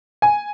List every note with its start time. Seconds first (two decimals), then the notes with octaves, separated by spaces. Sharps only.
0.22 G#5